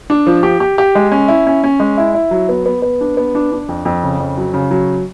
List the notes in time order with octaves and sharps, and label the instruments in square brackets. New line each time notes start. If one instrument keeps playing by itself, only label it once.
[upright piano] D4
F3
G4
G4
G4
G#3
C#4
E4
C#4
C#4
G#3
E4
E4
F#3
B3
B3
B3
D4
B3
D4
D4
F2
F2
C#3
F2
F#3
C#3
F#3